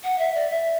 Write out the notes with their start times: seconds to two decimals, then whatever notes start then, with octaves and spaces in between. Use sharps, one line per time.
0.03 F#5
0.18 E5
0.34 D5
0.50 E5